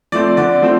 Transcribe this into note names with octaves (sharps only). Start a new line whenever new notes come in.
F3 A3 C4 D5
D3 D5
F3 A3 C4